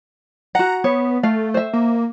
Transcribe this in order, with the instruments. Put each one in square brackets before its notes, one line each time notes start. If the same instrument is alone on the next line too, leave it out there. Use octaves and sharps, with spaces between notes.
[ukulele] F#4 F#5 [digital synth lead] A#5
[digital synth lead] B3 [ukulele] C#5
[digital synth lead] A3 [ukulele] F5
[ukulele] C5 E5
[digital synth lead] A#3